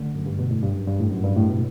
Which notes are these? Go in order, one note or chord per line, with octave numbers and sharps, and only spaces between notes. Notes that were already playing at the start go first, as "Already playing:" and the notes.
Already playing: D3 A3
F#2
G2
B2
A2
G2
F#2
G2
A2
F#2
G2
A2
B2